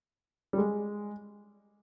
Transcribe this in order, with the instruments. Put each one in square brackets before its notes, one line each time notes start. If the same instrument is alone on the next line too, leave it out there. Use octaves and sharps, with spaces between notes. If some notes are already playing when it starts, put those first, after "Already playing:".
[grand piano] G3
G#3